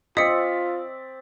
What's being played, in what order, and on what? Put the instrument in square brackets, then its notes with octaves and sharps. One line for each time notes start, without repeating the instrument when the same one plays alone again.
[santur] C4 D5 [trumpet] F4 [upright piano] D#5 B6 [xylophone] D#6 C#7